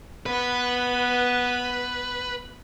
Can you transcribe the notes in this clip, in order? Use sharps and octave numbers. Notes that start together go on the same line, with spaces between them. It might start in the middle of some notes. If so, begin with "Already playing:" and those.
B3 B4